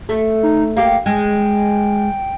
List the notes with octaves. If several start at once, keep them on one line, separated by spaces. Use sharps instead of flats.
A3
D#4
A#3 G4 F5
G#3 G5